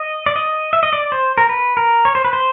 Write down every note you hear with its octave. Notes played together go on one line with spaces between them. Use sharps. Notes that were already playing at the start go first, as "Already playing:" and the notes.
Already playing: D#5
D5
D#5
E5
D#5
D5
C5
A#4
B4
A#4
C#5
C5
B4
C5